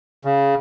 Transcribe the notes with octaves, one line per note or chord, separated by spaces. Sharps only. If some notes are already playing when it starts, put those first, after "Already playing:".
C#3